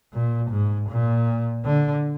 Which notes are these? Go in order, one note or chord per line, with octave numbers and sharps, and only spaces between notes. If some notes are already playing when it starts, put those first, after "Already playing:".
A#2
G#2
A#2
D3